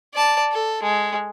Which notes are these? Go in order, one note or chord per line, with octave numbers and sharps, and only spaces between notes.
D5 A5
A4
G#3